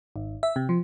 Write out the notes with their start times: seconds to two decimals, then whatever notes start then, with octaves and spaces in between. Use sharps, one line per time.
0.16 G#1
0.43 E5
0.56 C3
0.69 F3